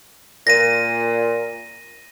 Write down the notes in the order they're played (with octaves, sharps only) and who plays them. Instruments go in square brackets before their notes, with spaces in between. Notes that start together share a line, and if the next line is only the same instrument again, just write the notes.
[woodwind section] A#2 [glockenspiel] A#6 D#7